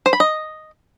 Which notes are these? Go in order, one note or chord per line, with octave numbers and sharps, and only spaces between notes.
C5
B5
D#5